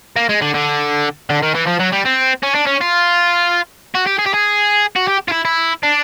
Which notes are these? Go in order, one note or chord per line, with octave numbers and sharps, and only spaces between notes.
A#3
G#3
D3
D3
D3
D#3
E3
F3
F#3
G3
C4
C#4
D4
C#4
F4
F#4
G4
G#4
G4
G#4
F#4
G4
F4
E4
E4
D4